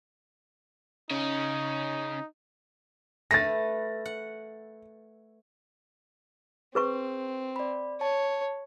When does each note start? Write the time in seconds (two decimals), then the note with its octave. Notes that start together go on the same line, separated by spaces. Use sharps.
1.11 C#3 C#4 D#4
3.31 A3 B4 A6 A#6
4.05 F#5
6.75 C4 G#4 B4 C#6
7.56 D5 B5
8.01 C#5 A5